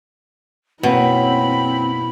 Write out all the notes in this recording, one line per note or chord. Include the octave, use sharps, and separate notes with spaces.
F#2 B2 A#3 C4 E4 C#5 B5